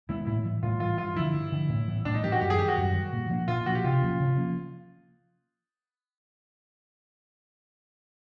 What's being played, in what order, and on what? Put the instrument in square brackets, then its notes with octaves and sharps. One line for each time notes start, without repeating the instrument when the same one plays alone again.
[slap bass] D#3 G#3 B3 [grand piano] E4
[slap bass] A2 [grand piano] E4
[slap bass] E3 G3
[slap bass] A2 [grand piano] F4
[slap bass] E3 G3 [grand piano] F4
[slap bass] G2 [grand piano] F4
[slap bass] D3 F3 [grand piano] E4
[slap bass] G2
D3 F3
A2
E3 G3 B3
[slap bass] A2 [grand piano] D4
[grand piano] D#4
[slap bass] E3 G3 B3 [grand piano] G4
[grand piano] F#4
[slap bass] F#2 [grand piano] G4
[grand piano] G#4
[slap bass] D#3 G3 [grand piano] G4
[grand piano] F#4
[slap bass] F#2
D#3 G3
A#2
F3 A#3 D4
[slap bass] A#2 [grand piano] F4
[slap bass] F3 A#3 D4 [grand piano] F#4
[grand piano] G4
[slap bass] C3 [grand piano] F4
[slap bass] F3 A#3 C#4
C3
F3 A#3 C#4